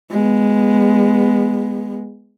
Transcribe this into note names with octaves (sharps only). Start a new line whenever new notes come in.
G#3 B3